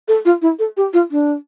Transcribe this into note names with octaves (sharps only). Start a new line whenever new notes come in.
A4
F4
E4
A4
G4
F4
D4